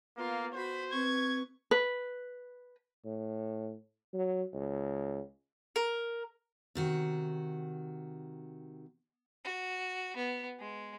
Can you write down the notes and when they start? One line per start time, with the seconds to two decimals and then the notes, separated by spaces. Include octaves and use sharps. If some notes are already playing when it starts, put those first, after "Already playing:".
0.17 A#3 B3 F4
0.54 F#4 C5 B5
0.92 C4 B4 C#6 G#6
1.71 B4
3.05 A2
4.13 F#3
4.53 C#2
5.76 A#4
6.75 C3 D#3 F#4
9.44 F#4
10.16 B3
10.60 G#3